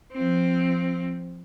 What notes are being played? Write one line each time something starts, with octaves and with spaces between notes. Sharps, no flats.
F3 C4